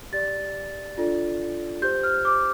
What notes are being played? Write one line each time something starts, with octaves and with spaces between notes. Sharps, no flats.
G4 D5 A6
D4 F4 A4 D5
G4 C5 G6
F6
D6